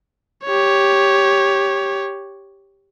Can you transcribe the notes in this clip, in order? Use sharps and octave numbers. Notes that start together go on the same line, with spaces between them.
G4 C#5